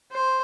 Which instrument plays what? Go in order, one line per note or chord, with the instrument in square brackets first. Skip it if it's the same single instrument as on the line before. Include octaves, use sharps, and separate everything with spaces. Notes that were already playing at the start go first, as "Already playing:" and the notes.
[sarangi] C5